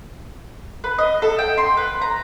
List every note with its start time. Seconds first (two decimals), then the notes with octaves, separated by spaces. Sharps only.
0.84 B4
0.98 D#5
1.22 A4
1.39 G5
1.57 C6
1.77 B4
2.01 A#5